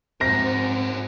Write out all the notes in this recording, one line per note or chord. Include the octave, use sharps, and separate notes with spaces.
G#2 C4 F#4 A#4 A#6